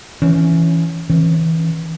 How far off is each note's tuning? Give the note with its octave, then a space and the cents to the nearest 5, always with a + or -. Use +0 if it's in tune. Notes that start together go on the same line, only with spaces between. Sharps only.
E3 +0 C#4 +5
E3 -20 C#4 -20